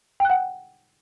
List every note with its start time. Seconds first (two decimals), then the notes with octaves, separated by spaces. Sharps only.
0.20 G5
0.25 F#6
0.30 F#5